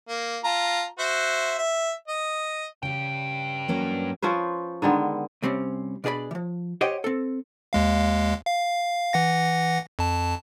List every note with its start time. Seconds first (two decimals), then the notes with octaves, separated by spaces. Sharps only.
0.09 A#3
0.44 F4 A5 A#5
0.99 F#4 C5 E5
1.58 E5
2.08 D#5
2.83 G2 C#3 G4 G5
3.68 F#3 A#3 C#4
4.22 F3 C#4 B4 C5
4.82 D3 D#3 G#3 B3
5.43 C2 G3 C4 C#4
6.04 B2 D4 G#4 D5 B5
6.31 E3 F3
6.81 G4 C5 C#5 D#5 F#5 G5
7.04 C4 A4
7.73 D#2 G#3 F5
8.47 F5
9.13 E3 F#5 A#6
9.99 F2 A5